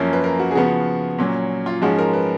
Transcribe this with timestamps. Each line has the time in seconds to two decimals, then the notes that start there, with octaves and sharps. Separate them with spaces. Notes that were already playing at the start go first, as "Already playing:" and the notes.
Already playing: F#2 F3 A#3 C#4
0.13 B4
0.24 A#4
0.40 F#4
0.51 G#4
0.55 C#3 F3 B3 F#4
1.19 A#2 F#3 C#4
1.66 F4
1.82 G#2 F3 G#3 C#4 F#4
1.98 A#4
2.13 B4